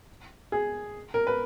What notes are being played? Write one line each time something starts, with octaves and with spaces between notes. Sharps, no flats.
G#4
A#4
B4